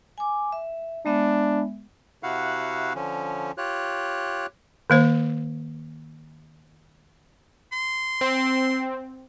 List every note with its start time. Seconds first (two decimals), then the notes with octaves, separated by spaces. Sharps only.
0.18 G#5 D6
0.52 E5
1.06 G#3 B3 D4 E5
2.23 C3 E4 F#4 F5 F#5
2.95 D3 F3 C#4
3.58 F4 G4 C#5 F#6
4.90 D#3 A#3 C5
7.72 C6
8.21 C4